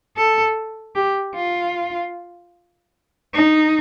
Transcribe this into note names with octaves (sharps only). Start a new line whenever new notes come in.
A4
G4
F4
D#4